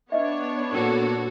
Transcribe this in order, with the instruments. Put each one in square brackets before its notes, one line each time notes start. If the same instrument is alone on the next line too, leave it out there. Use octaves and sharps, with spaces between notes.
[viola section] B3 D4 C#5 [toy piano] B4 D#5 E5
[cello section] A#2 F#4 A4 [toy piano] A#4 G5